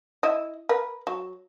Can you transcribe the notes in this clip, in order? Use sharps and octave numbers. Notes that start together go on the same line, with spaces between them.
E4 D#5
A#4 B4
F#3